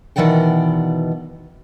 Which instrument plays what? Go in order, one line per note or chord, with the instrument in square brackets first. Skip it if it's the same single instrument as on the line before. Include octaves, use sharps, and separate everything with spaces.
[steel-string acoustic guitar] B2 D#3 E3 D5 F#5 G5